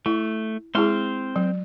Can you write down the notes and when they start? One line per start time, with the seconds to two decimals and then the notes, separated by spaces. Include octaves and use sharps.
0.06 A3 E4
0.75 G#3 C4 E4 G#4 C6 F6
1.36 F#3